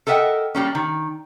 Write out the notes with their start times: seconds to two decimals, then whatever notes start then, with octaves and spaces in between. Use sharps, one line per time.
0.07 A4 A#4 D#5 E5 F#5 G5
0.55 G3 A#3 C#4
0.75 D#3